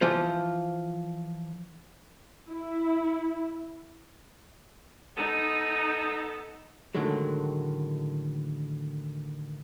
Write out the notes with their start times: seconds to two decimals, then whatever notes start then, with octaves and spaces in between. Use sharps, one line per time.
0.01 E3 F3 F4 C5
2.50 E4
5.17 B3 D#4 A4 D#7
6.95 A2 D3 D#3 F#3 G#3